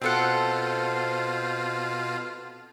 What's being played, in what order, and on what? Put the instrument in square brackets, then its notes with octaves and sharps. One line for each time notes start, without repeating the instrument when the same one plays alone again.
[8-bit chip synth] B2 F4 [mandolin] C4 A4 F#5 [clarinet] C5